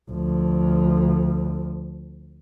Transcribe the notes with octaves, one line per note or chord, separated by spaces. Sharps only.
D2 F3